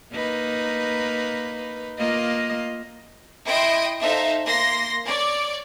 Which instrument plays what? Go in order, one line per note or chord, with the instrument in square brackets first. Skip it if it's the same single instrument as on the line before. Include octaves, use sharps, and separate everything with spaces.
[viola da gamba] A#3 D#4 B4
A#3 F4 D#5
[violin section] E4 D#5 G5 C6 D#6 D7
D#4 A4 C5 E5 F5
A#3 C6 A#6
C#5 D5